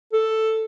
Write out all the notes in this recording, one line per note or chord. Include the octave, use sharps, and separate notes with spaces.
A4